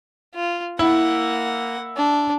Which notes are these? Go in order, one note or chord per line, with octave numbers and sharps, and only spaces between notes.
F4
A#3 E4 F#5
D4